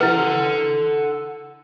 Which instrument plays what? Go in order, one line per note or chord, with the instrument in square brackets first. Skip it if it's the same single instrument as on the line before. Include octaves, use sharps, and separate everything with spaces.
[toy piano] E4 B4 [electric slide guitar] A4 F#5